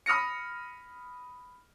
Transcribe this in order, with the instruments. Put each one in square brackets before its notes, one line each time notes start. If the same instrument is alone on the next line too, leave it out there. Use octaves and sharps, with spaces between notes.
[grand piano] B5 D#6 F6 A#6 C#7